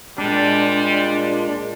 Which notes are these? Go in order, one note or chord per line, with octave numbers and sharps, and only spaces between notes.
A#2 G3 G#3 D4